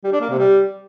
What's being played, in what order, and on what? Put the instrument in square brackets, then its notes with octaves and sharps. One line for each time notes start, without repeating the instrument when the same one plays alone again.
[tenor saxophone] G3
D4
A#3
C3
G3